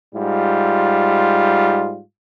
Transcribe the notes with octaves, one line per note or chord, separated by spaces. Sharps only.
G#2 G3 F4